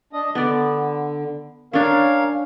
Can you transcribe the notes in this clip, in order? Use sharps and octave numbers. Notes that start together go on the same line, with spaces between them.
D4 D#5
D3 B3 D5
C#4 D4 A#4 C#5 F5